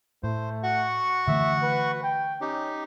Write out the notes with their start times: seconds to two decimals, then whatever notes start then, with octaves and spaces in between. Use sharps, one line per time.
0.23 A2 A3 C5
0.63 F#4 F#5 C#6
1.28 D3 E3 A3 E5
1.62 B4
2.03 G5
2.41 C#4 D#4 G4